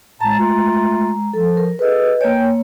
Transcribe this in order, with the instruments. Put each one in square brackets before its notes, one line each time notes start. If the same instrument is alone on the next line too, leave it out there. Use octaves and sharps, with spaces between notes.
[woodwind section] A2 A5 [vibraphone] G#3 A#5
[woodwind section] A3 F4
[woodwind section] F3 [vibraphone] A4
[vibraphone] A#4
[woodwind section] G#4 A4 [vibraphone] B4 D#5
[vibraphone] A#3 C#5 [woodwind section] A#4 G5 G#5